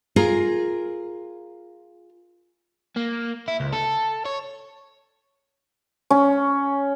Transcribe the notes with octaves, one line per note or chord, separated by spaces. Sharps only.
F4 G#4 A#4
A#3
E4
C#2
A4
C#5
C#4